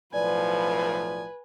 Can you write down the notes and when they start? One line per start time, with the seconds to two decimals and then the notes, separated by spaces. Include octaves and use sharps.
0.14 B1 A2 F3 B4 D5 G#5